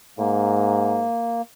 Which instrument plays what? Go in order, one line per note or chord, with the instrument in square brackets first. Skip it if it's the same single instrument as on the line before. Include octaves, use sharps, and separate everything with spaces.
[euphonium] G#2 [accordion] A#3